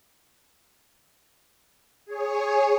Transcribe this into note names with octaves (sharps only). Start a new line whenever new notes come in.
G#4 C#5